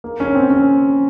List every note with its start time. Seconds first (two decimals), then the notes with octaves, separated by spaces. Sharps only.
0.04 A#3
0.20 C#4
0.35 C4
0.50 C#4